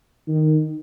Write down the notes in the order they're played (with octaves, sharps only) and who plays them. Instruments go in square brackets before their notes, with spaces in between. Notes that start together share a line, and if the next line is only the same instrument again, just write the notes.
[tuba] D#3